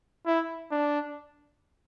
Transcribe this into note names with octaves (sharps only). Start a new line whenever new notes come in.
E4
D4